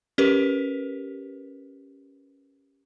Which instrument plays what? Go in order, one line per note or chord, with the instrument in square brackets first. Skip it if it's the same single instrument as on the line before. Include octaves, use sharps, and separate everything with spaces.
[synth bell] C#4 G4 A#4 B4